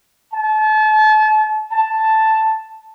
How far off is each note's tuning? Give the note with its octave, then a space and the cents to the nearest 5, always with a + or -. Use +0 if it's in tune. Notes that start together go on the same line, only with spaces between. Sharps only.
A5 -35
A5 +0